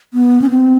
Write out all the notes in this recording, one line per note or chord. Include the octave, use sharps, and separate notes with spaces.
B3
C#4
C4